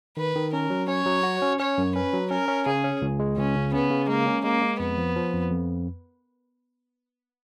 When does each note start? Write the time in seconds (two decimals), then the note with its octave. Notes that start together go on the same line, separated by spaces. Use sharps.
0.17 D#3 B4
0.36 D#3
0.53 C#4 A#4
0.70 F#3
0.88 C#4 C#5
1.06 F#3
1.23 F#4
1.42 C#4
1.59 C#4 C#5
1.78 F#2
1.95 C#4 B4
2.13 F#3
2.31 C#4 A#4
2.48 C#4
2.66 C#3 G#4
2.84 C#4
3.02 C#2
3.19 G#3
3.37 C#2 C#4
3.56 C#3
3.73 B3 C#4
3.91 C#3
4.08 G#3 A#3
4.27 C#4
4.44 G#3 A#3
4.62 G#3
4.79 F2 B3
4.98 F3
5.16 F3
5.33 F2
5.51 F2